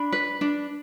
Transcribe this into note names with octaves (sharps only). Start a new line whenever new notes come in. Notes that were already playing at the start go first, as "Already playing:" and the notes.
Already playing: D4 B5
B4
D4